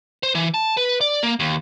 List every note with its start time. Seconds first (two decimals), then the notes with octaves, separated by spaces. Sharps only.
0.23 C5
0.35 E3
0.54 A5
0.77 B4
1.01 D5
1.23 A#3
1.40 D#2